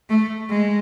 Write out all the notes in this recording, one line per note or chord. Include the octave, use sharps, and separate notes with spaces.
A3
G#3